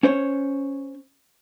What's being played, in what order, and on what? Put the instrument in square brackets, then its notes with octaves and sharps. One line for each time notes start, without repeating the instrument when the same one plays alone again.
[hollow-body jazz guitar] C#4 C5 C#5